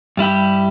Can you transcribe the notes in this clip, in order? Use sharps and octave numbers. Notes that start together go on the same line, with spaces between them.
G2 G3 E4 G4